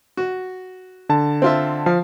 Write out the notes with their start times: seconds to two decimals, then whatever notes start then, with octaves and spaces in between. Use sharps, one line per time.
0.17 F#4
1.09 D3 A5
1.42 C4 F4 E5
1.86 F3 F5